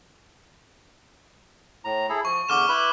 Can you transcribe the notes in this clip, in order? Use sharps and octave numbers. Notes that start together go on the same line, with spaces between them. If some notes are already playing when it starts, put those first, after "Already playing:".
A2 A#5
E4 G#4 A4
F3 C#6
E2 D3 D6 F6 E7
E4 B4 B5